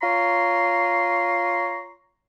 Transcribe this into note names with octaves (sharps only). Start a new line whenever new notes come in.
F4 C#5 A#5 C6